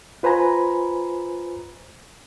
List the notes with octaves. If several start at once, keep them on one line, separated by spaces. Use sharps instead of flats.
F4 B4 C5 G#5 A#5 B5